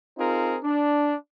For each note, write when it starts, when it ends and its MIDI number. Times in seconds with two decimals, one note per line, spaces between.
0.18 0.57 60
0.18 0.57 63
0.18 0.57 65
0.18 0.57 68
0.18 0.57 70
0.63 1.14 62